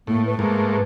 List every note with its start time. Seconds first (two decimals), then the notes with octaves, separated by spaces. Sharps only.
0.07 A2 A#3
0.26 B4
0.39 G#2 A3 A#3